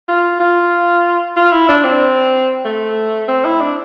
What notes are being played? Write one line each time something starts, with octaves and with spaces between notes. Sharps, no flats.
F4
F4
F4
E4
D4
C4
A3
C4
E4
D4